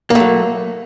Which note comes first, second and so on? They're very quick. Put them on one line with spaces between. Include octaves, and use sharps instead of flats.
A#3 A3 F#3